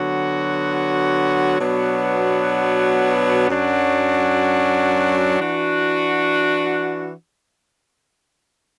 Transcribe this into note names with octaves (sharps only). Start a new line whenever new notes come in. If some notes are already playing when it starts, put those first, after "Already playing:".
Already playing: D3 F#3 B3 F#4
B2 F#3 B3 D4
F#2 F#3 D4 F#4
E3 D4 F#4